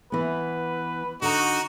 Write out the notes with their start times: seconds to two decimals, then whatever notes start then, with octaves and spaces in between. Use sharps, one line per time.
0.12 E3 B3 B4
1.22 D3 D#4 F#4 A#5